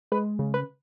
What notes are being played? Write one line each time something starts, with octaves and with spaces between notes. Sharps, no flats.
G#3 B4
C#3
B4